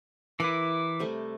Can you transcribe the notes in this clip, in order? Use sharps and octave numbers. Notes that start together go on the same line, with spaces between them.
E3 E4 A#4 B4 B5 D6
C3 G3 A3